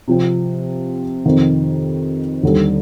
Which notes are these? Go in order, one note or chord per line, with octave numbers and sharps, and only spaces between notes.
C3 F3 C4
F2 C3 D#3
D#2 D3 G3